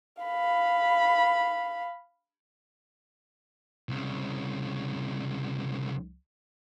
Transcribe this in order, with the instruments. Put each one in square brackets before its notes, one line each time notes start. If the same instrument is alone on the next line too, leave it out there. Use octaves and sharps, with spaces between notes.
[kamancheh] F5 B5
[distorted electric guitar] C2 C#3